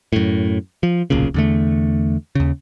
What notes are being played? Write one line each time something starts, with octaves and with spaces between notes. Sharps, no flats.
F#2 A2
F3
D1 B1 A#2 C#3
E2 D3 A3
D#2 C#3